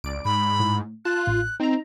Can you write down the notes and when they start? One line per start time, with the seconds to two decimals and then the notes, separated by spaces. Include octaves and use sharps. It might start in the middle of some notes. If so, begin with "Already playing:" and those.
0.04 C#2 D5 D7
0.25 G#2 B5
0.60 A2
1.05 F4 A5 F#6
1.27 A1
1.60 C4 D#4 A#5